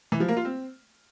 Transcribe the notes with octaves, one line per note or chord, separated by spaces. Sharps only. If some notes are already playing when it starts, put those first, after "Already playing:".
E3
F3
A#3
F4
C4